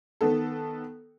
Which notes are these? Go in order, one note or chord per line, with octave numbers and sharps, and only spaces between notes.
D#3 B3 A4